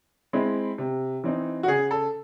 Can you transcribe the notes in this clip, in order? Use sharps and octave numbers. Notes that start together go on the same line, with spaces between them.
G#3 C4 E4
C3
E3 C4 D#4
F#4
C#3 G#4
A4